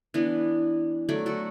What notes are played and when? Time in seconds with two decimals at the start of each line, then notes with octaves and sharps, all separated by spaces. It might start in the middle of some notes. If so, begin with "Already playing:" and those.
0.14 E3 B3 D4
1.09 F#3 A3 D5
1.26 F#4 A4